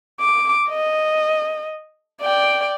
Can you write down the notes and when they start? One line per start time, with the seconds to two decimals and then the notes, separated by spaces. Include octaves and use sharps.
0.20 D6
0.69 D#5
2.21 D5 G5